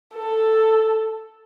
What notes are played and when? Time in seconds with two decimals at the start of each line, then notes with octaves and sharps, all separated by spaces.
0.15 A4